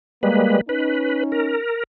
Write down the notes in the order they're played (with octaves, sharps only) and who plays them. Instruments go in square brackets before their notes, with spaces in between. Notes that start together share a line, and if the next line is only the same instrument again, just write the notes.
[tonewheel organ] G3 G#3 B4 [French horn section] A#3
[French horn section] C#4 D#4 [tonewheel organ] B4
[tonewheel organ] A#4